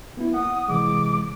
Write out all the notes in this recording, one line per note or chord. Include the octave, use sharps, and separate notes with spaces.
A#3 B3 E4
F#5 D#6
C3 E3 G#3 D6